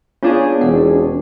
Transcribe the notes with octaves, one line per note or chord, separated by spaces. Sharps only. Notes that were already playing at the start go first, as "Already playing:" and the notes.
B3 C#4 D4 F4 G#4 C#5 F5
E1 F#5